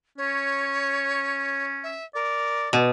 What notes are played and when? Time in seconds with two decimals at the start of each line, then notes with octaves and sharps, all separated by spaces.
0.18 C#4 C#5
1.83 E5
2.15 A#4 D5
2.73 B2 D5